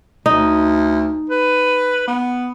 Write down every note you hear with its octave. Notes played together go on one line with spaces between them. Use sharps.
D2 D#4
B4
B3